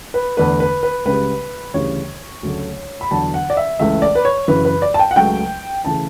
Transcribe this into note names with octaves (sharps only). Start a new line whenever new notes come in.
B4
E2 D3 A3 B4
B4
B4
C#2 C#3 G3 B4
D2 C#3 E3 G3 C#5
D2 C#3 F#3 A3
B5
E2 D3 F#3 A5
F#5
D5
E5
C#2 C#3 E3 A3 E5
D5
B4
C#5
F#2 C#3 E3 B4
B4
D5
A5
G5
F#5
C#2 C#3 F#3 A3 G5
C#3 E3 A3 A5